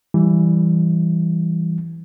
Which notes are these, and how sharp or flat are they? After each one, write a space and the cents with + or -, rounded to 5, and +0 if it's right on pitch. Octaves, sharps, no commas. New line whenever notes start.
E3 +10 G3 +0